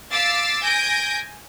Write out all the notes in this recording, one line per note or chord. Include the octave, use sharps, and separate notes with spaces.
F5 D6 E6 A6 B6 C7
G#5 G6 A#6 D7